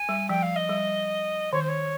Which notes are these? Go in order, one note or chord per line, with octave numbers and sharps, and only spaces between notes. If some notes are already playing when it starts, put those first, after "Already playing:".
Already playing: G#5
G3
F3 G5
F5
D#5
G3
D#3 C#5
C5
C#5